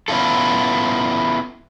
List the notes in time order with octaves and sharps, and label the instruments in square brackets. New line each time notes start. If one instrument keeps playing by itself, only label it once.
[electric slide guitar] B3 C#4 E4 F4 A4